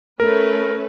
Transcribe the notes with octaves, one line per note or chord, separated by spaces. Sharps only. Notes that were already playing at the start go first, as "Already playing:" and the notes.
A3 C#4 A#4 B4